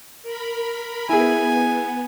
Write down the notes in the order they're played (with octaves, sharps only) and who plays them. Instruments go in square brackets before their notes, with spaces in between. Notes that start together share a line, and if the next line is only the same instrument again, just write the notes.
[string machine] A#4 B5
[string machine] B3 [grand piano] E4 G#4 [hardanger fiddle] G#5